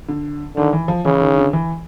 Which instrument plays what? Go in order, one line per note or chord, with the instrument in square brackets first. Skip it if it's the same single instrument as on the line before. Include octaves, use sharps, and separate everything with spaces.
[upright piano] D3
[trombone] D3 [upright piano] D#3
[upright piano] E3
F3
[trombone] C#3 [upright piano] E3
[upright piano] D#3
D3
E3